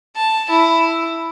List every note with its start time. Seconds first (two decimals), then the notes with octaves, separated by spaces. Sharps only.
0.16 A5
0.50 E4